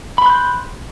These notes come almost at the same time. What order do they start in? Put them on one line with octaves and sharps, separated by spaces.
B5 C6 F#6 G6